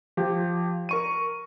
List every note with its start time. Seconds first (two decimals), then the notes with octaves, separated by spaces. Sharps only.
0.17 F3 G4
0.89 A#4 C#6 D#7